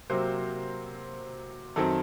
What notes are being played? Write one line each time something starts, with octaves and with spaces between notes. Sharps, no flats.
C3 F#3 A#3 C5
F#2 D#3 F#3 C4 A4